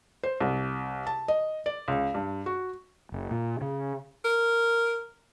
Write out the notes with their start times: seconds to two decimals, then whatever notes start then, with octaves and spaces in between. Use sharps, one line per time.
0.24 C5
0.40 C2
1.07 A5
1.28 D#5
1.66 D5
1.88 C#2
2.14 G2
2.46 F#4
3.12 F#1
3.31 A#2
3.61 C#3
4.25 A#4